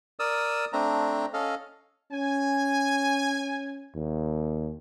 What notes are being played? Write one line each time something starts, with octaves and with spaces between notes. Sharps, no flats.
A#4 D5 D#6 E6
A3 C4 D4 A#5
C#4 A4 D#5 F5
C#4 G#5
D#2